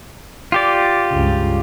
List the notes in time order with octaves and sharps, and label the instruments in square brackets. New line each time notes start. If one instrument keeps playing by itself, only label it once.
[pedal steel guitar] F4 G4 D5
[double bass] C#2 G2